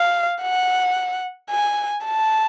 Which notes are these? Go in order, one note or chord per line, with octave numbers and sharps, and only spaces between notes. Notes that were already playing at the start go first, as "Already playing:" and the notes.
Already playing: F5
F#5
G#5
A5